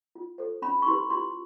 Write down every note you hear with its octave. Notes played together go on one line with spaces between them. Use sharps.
F4
A4 C5
C#4 B5
C#6
E4 G4 B4 C6
F4 C6